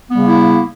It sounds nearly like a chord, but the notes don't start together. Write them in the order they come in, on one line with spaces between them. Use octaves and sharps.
B3 G3 C#3 A#3 E4